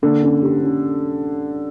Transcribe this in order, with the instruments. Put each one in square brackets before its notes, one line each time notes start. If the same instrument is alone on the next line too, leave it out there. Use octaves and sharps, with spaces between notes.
[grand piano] D3 [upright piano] A#3
[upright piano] C#4
G4
C#4